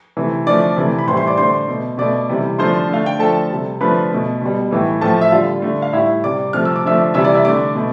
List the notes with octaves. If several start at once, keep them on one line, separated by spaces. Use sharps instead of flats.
C3 E3 A3
D3 F3 A3 D5 D6
C3 E3 A3
B5
A2 E3 G3 C5 C6
C5 C6
D5 D6
D3 A3 C5 C6
B2 A3
B2 A3 D5 D6
C3 E3 G3
D3 F3 A3 C5 C6
D3 A3 F5
G5
D3 F3 A3 A4 A5
C3 G3
D3 F3 A3 B4 B5
B2 A3
B2 G3
A2 E3 A3
A2 F3 A3 A4 A5
E5
D3 G3 F4 F5
D3 A3
F5
A2 G3 E4 E5
C3 G3 D5 D6
C3 F3 A3 F6
E6
D6
D3 F3 A3 E5 E6
C3 E3 G3 E5 E6
D5 D6
E5 E6
D3 A3 D5 D6
B2 A3